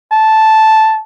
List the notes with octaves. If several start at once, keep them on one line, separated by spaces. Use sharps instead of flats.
A5